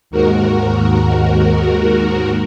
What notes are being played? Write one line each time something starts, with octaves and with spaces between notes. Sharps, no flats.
D#2 G#2 F#4 A#4